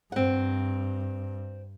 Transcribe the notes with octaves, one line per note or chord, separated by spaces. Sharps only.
G2 C4 F#5